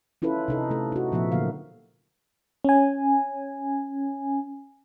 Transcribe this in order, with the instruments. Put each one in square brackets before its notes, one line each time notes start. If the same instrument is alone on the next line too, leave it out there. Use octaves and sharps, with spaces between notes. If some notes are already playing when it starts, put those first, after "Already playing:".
[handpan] C#4 E4 F4 A4 B4
C3 D#4 A4
A3 A4
D#4 F#4
A#2 F3 A3 B3 E5
D3 F#3 A#3 F5
[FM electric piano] C#4 G#5